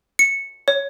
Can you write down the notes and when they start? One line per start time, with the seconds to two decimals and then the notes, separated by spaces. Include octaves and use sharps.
0.19 C#7
0.68 C#5